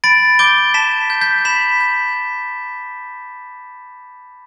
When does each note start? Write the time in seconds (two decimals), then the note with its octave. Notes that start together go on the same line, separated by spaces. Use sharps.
0.04 B5 A6 D7
0.39 D6 G6 D7 G7
0.74 A5 B6 E7
1.10 G6
1.21 G6 B6
1.45 B5 B6 E7
1.80 G6